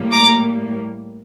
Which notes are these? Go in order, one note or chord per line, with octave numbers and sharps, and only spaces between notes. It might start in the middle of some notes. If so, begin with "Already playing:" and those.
Already playing: A2 G3 A#3
A#5 D6